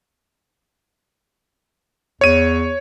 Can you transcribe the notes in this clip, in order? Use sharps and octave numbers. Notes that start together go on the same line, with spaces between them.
E2 C#5 D#7